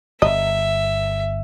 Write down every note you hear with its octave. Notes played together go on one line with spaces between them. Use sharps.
G1 D#5 E5